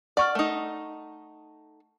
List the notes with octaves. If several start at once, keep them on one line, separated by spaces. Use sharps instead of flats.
D5 F#5 C#6 F6
A3 D#4